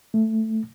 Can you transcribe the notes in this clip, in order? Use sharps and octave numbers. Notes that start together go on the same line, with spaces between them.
A3